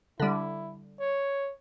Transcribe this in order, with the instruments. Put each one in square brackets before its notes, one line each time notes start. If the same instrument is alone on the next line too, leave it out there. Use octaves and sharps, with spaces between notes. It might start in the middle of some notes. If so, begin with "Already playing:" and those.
[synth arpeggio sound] D3 G3 [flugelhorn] E4
[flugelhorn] C#5